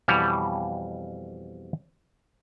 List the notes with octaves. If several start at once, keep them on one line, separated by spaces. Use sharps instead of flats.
F2 B2 E3 G3 C#5